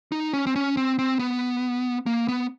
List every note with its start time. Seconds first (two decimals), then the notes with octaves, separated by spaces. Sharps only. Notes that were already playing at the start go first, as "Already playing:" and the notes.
0.12 D#4
0.33 C#4
0.47 C4
0.56 C#4
0.77 C4
0.99 C4
1.19 B3
2.06 A#3
2.28 B3